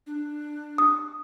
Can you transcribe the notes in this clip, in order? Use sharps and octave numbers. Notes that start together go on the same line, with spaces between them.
D4
D#6